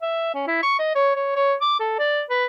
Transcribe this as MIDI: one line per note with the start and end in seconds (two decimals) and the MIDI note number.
0.02 0.33 76
0.34 0.42 61
0.47 0.58 64
0.63 0.76 85
0.79 0.91 75
0.95 1.13 73
1.15 1.32 73
1.36 1.54 73
1.61 1.77 86
1.80 1.94 69
1.99 2.22 74
2.30 2.46 71